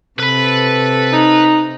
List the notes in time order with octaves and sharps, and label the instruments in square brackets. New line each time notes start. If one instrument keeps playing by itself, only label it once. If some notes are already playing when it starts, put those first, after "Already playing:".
[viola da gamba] C3 [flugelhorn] A4 [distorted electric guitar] B4 B5
[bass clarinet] D#4